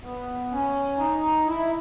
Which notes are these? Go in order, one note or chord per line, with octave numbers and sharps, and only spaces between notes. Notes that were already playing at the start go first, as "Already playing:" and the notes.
B3
C#4
D#4
E4